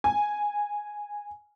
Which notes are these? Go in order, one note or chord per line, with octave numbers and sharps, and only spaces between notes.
G#5